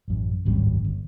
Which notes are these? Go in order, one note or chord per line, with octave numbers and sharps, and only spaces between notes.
A1 F#2
D1 G#1 F#2 G3
G1